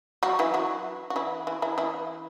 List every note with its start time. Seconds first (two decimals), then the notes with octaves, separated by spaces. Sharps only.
0.23 F#3 F#4
0.39 E3 E4
0.54 F#3 F#4
1.10 F#4
1.16 E3 E4
1.47 E3 E4
1.62 E3 E4
1.78 E3 E4